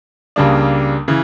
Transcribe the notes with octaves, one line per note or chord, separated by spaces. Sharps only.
C#2 C#3 G3 A#3 D4
C#3 E3